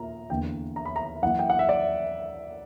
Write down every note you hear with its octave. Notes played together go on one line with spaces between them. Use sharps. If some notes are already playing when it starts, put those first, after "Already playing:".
Already playing: A#2 A#5
E2 D3 A#3 G5
A#5
B5
A#5
F#2 E3 A#3 E4 F#5
G5
F#5
E5
D5